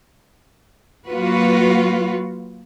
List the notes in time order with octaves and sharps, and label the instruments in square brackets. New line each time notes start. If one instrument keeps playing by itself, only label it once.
[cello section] F#3 A#3 F4 F#4 B4